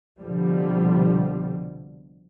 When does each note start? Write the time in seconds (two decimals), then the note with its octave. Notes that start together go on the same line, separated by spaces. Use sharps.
0.19 C2 B2 D3 F3 G3